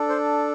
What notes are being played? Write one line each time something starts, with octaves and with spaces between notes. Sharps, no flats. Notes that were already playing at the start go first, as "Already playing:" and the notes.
Already playing: D4 A4
C5